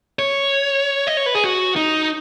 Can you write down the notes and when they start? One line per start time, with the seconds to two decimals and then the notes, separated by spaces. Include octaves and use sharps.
0.19 C#5
1.07 D#5
1.17 C#5
1.26 B4
1.35 G#4
1.44 F#4
1.76 D#4